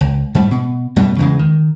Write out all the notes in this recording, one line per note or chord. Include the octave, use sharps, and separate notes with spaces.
C#2
G#2 G3 A3
B2
F#2 B2 G3 A3
E2 C#3 G#3
D#3